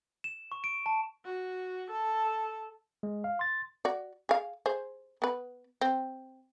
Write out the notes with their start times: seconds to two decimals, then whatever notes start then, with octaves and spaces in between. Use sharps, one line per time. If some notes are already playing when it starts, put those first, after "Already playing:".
0.24 E7
0.52 C#6
0.64 D7
0.86 A5
1.25 F#4
1.90 A4
3.03 G#3
3.24 F5
3.39 C6 A6
3.85 F#4 D5
4.29 G#4 F5
4.66 G#4 C5
5.22 B3 B4
5.81 C4